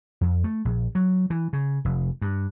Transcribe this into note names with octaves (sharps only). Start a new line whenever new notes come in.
F2
A3
A#1
F#3
E3
C#3
F1
G2